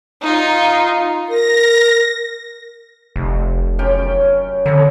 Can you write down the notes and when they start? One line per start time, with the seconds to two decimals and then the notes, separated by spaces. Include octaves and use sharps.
0.22 D#4 F4
1.29 A#4 A#6
3.16 F1
3.79 F#2 C#4 G5
4.66 D3 C#5 A#5